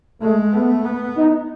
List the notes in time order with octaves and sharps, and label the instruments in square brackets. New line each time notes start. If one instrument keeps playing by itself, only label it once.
[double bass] G#3 [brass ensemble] A3
[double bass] A3 [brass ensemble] B3
[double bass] B3
[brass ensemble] D#4